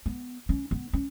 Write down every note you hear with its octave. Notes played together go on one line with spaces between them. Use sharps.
B3
C#4
B3
C#4